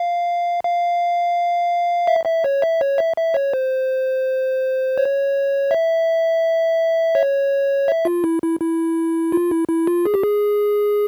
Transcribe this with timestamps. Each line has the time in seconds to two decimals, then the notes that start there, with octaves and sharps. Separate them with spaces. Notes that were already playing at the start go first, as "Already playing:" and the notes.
Already playing: F5
0.64 F5
2.07 E5
2.26 E5
2.44 C#5
2.62 E5
2.81 C#5
2.98 E5
3.17 E5
3.34 C#5
3.53 C5
4.98 C#5
5.71 E5
7.15 C#5
7.88 E5
8.05 F4
8.24 E4
8.42 E4
8.61 E4
9.32 F4
9.51 E4
9.68 E4
9.87 F4
10.06 G#4
10.14 G4
10.24 G#4